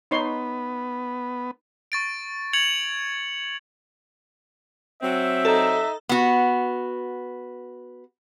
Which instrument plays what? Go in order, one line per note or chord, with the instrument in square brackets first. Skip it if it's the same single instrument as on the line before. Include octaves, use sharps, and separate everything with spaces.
[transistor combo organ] B3 [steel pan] D#4 C#5 C6
[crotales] C#6 A6 D7
G#6 C#7 F7 F#7
[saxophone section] F#3 C4 [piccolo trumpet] E5
[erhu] D#4 [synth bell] A4
[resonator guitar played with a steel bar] B3 F#4